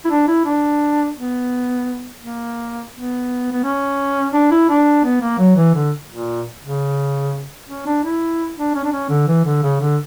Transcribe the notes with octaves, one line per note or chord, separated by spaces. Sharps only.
E4
D4
E4
D4
B3
A#3
B3
B3
C#4
D4
E4
D4
B3
A#3
F#3
E3
D3
A#2
C#3
C#4
D4
E4
D4
C#4
D4
C#4
D3
E3
D3
C#3
D3